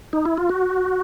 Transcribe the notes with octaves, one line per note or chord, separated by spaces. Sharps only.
D#4
E4
F4
F#4